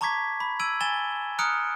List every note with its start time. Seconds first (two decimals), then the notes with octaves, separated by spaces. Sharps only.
0.01 A5 A#5 C#6 D6 G#6 B6
0.40 B5
0.60 E6 G#6 D7 D#7 F#7
0.81 G#5 A6 E7 G7
1.39 A#5 D#6 F6 F#6 C#7 D7